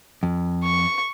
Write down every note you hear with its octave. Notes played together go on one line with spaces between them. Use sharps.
F2
C#6